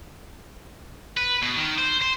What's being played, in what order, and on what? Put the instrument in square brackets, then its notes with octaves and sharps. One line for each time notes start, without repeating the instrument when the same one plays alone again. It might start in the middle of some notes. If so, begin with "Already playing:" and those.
[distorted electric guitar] B4
B2
D#3
C5
C5